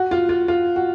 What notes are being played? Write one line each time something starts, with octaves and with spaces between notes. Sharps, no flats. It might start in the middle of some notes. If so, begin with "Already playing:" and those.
Already playing: F#4
F4
F4
F4
F#4